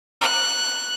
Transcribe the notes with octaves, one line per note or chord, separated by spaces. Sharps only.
F#6